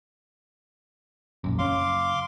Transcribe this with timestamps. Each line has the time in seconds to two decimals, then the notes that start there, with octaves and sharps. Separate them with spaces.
1.44 E1 A#1 F#2
1.59 F#1 C#4 F5 C6 D6